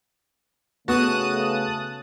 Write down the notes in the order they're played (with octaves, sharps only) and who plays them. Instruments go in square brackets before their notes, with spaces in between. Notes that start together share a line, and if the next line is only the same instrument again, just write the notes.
[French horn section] C#3 A3 [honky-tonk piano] B3 [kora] F#4 [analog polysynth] A5 D#6 F#6